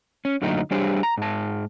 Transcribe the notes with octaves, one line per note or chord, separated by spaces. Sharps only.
C#4
F#2 A#2 D3 F#3 A3 D#4
G3 D4 G4 G#4 C5 C#5
A#5
G#2 A5